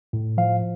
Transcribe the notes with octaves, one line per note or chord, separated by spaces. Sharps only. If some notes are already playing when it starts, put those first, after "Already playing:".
A2
F3 F5